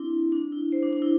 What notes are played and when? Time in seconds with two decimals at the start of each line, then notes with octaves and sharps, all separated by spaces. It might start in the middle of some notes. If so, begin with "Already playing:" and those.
Already playing: C4 D4 E4
0.32 D4
0.52 E4
0.72 C5
0.83 D4
0.93 D4
1.02 E4